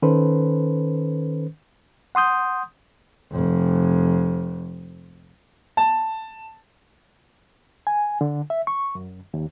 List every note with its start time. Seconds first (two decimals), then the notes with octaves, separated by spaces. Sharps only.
0.02 D#3 C#4 A4 B4 C5
2.15 F#5 C6 D#6 G6
3.32 F1 F2
5.77 A5
7.87 G#5
8.21 D3
8.50 E5
8.67 C#6
8.95 F#2
9.34 D#2